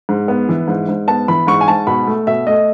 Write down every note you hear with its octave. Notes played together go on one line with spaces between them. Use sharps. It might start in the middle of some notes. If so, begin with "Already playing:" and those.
G#2
B3
E3
G#2
G#2
B3 A5
E3 B5
G#2 C#6
G#5
G#2 A5
B2 B5
A3
B2 E5
A3 D#5